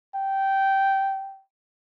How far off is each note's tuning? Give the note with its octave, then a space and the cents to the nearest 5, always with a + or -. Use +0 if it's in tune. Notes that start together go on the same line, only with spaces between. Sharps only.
G5 -15